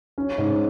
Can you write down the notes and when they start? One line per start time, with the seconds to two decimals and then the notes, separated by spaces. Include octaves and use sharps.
0.18 C#4
0.38 G#2